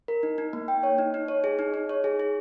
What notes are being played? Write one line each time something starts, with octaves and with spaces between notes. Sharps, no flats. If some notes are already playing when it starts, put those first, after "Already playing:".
A#4
D#4
D#4
A#3
G5
C#5
D#4
D#4
C#5
G#4
D#4
D#4
C#5
G#4
G#4